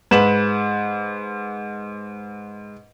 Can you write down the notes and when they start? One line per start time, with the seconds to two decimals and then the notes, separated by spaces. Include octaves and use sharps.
0.11 G#2 B4 E7 F#7